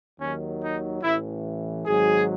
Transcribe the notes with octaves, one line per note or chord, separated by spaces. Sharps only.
D#2 D#3 F#3 C#4
D#4
A1 A2 E3 E4
G#1 G#2 F#3 G#4